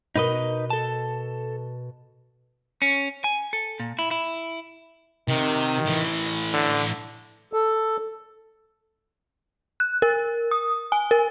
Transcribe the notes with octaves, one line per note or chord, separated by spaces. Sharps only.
B2 B3 D#4 A#4 B4 D#5
A4 A5
C#4
G#5
A4
A#2
E4
E4
C3 D#3
A2 E3
D3
A4
F#6
A#4
D#6
G#5
A#4